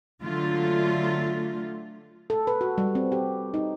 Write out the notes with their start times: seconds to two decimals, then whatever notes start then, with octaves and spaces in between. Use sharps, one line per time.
0.22 D3 F#3 A3 F4
2.30 A4
2.47 B4
2.61 F#4
2.78 G3
2.95 C4
3.12 G4
3.54 D#4